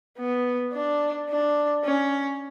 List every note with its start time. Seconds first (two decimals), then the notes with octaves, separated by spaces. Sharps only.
0.18 B3
0.74 D4
1.29 D4
1.84 C#4